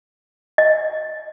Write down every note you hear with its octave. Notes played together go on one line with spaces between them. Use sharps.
D#5